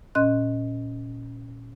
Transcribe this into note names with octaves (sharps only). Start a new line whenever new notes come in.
A#2 C#4 D#5 C6 F#6